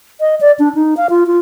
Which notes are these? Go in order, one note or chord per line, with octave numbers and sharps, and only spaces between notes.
D#5
D5
D4
D#4
F5
F4
F4